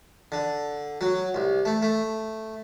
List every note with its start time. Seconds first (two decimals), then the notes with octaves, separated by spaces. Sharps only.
0.32 D3
1.01 F#3
1.35 C2
1.65 A3
1.82 A3